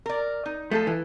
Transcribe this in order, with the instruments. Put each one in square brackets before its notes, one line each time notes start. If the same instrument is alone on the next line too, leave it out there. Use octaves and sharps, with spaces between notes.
[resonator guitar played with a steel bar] A#4 D5
D#4
[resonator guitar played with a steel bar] F3 G#3 A4 [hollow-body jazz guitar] A3
[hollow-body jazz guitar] E3